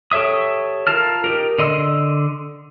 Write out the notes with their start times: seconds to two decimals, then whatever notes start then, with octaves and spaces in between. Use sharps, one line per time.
0.11 G4 A4 C#5 E5 D#6
0.87 F4 A#4 A5 F6
1.24 D#4 G4 A#4
1.59 D3 D#5 C6 E6